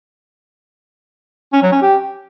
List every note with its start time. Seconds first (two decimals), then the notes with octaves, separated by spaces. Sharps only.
1.53 C#4
1.62 F#3
1.72 C#4
1.82 G4